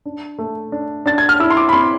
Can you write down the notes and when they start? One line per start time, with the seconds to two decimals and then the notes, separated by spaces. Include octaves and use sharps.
0.05 D4
0.39 A3
0.72 D4
1.06 D4 A6
1.18 G#6
1.29 F6
1.40 E4 E6
1.50 C6
1.57 D6
1.69 B5
1.73 C4 C6